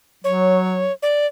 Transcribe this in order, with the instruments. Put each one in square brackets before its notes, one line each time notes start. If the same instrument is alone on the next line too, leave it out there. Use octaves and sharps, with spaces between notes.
[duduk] F#3 [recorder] C#5
[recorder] D5